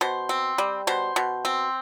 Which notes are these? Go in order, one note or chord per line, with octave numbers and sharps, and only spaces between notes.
B2 C5
C4
G3
B2 C5
B2
C4